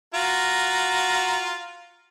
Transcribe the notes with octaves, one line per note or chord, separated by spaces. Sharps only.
F4 F#4 A#5